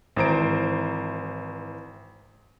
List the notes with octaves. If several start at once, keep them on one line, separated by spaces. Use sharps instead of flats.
G#1 E3 C5 A#5 D7